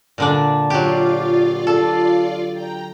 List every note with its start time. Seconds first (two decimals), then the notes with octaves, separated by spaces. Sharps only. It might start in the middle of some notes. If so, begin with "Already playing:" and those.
0.18 A#2 D3 D4
0.70 F#3 F4 G4 D5 F5
1.67 A4
2.52 G5 A#5